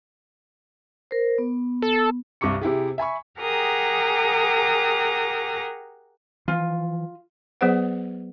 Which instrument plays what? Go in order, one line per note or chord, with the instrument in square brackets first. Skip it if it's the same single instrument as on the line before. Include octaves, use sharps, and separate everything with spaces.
[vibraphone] A#4 C5
B3
[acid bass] A4
[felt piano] C2 G2 C#6 D6 C#7
C3 E4 G4 G#4
E5 G#5 B5 C#6
[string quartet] G4 G#4 A#4 F#5 A#5 D#6
[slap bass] E3 F3 [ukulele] F4
[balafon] F#3 B3 G#4 B4 C5 F#5